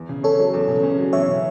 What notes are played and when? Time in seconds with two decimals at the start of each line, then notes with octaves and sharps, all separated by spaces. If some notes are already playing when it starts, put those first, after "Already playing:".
Already playing: E2
0.09 C#3
0.23 C#4 A4 C#5
0.39 F#3
0.54 E2
0.68 C#3
0.83 C#4
0.98 F#3
1.13 E2 C#5 E5
1.28 C#3